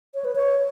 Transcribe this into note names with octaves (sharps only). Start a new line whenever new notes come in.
C#5
B4
C#5